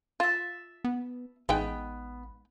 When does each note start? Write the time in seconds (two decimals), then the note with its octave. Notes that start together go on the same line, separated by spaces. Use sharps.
0.20 F4 E5 A5
0.84 B3
1.49 A1 G#3 B3 D#4 G5